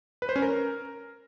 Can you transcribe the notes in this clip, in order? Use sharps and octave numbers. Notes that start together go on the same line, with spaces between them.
B4
C5
C#4
A#4